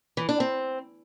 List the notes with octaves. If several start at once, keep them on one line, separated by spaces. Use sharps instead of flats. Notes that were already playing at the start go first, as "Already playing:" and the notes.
E3
D4
C4